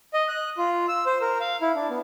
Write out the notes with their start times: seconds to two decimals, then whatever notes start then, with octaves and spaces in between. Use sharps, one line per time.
0.14 D#5
0.28 F#6
0.58 F4
0.88 E6
1.06 C5
1.21 A#4
1.40 F5
1.62 E4
1.75 D4
1.90 B3